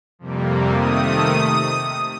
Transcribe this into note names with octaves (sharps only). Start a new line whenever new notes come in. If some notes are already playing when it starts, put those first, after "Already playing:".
F2 C3 G3 A#3
C3 D#3 A3 D#6